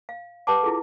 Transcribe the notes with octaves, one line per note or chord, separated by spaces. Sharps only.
F5
G4 B4 F#5 G5 A5 D6
E4 F4 G#4 A4